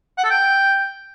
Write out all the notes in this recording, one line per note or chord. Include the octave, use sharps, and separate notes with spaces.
F#5
A4
G5